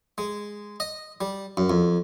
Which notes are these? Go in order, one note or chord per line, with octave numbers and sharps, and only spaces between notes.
G#3
D#5
G3
F#2
F2